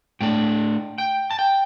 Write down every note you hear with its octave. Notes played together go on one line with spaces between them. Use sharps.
A2 A3 D4 G5
G5
A5
G5